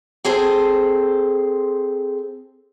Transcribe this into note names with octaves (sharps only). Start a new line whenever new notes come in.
C4 G#4 A4 C5